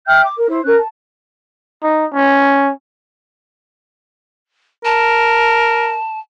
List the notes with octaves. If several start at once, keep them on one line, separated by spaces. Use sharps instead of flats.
E5 G5 F6 G6
D6
A#4
E4 C5
C#4 A#4 F#6
A5
D#4
C#4
A#4 A5